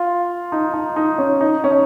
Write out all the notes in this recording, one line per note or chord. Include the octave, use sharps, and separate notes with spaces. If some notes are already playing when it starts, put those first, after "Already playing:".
Already playing: F4
D#4
D#4
D#4
C#4
D#4
C#4
D#4